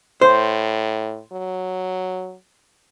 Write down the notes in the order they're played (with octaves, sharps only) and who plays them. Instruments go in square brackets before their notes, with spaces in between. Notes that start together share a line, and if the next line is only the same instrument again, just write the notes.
[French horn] A2 [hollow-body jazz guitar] C5
[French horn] F#3